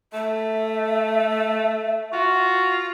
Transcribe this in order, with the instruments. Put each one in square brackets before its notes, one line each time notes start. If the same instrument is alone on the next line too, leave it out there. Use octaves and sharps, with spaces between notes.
[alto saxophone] A3 [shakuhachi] E5
[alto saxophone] F4 [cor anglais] F#4